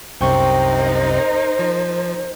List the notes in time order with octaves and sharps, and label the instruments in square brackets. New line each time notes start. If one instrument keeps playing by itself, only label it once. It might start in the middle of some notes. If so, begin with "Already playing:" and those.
[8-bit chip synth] C2 F#2 C3 [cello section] D#4 A#4 [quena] C5 [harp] G5 C#6
[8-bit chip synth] F3